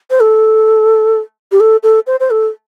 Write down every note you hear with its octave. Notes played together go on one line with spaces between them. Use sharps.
C5
A4
G4
A4
A4
C5
C5
A4